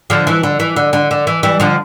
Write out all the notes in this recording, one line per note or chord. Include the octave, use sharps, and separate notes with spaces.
D3 F3
E3
D3
E3
D3
D3
D3
E3
E3 G3
D3 F3